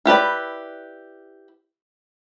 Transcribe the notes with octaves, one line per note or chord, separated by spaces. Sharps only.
E4 G4 B4 D5